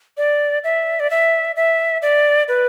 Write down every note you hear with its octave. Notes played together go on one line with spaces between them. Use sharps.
D5
E5
D5
E5
E5
D5
B4